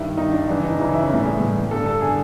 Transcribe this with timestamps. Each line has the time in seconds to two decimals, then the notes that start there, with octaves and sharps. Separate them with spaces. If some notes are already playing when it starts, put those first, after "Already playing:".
Already playing: G2 D#3 E4
0.17 G2 D#3 D#4
0.32 D4
0.48 F#2 C#3 E3 D4
0.63 D#4
0.79 F#2 C#3 E3 E4
0.94 E4
1.03 C#4
1.09 A2 E3 D4
1.25 G#4
1.40 A2 E3
1.71 G2 D3 A4
1.86 A4
2.01 D3 G#4